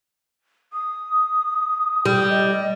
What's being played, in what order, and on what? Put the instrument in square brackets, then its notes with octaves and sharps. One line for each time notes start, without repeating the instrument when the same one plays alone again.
[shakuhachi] D#6
[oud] G3 [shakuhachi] G5
[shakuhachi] D#5